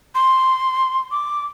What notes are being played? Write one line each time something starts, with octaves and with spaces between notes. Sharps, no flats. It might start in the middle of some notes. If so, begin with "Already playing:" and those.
C6
D6